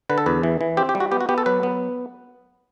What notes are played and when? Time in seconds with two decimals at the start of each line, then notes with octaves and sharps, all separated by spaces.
0.10 D3 B4
0.18 A4
0.26 E2 B4
0.43 E3
0.61 E3
0.77 C4 G4
0.89 G4
0.95 G3
1.00 F#4
1.12 B3 G4
1.21 F#4
1.29 B3 G4
1.38 A4
1.46 F#3 B4
1.63 B3